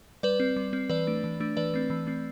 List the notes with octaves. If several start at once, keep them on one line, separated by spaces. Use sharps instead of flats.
G3 B4 D5
C4
G3
C4
E3 B4 D5
A3 D4
E3
A3 D4
E3 B4 D5
A3 C4
E3
A3 C4